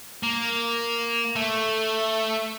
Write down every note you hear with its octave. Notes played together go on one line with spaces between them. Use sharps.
A#3
A3